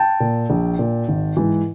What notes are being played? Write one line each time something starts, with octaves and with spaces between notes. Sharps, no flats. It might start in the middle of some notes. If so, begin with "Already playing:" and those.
Already playing: G5 A5
A#2
A#1
A#2
G#1
G#2 E3